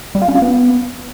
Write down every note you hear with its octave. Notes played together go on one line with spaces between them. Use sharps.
G3
F4
C#4
F4
B3